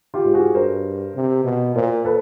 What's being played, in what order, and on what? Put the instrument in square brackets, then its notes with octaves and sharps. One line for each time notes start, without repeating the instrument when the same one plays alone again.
[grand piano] F4 G4
[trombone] G#2
[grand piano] F#4 G#4
[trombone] G2 [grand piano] A#4 C5
[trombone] C3
B2
[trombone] A#2 [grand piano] A#4 C5
[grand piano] A4 B4